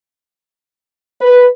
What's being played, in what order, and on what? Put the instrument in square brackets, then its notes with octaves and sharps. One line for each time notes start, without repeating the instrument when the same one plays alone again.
[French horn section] B4